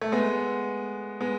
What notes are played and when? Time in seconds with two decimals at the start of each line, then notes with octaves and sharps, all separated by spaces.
0.02 A3
0.12 G#3 B3
1.21 G#3 B3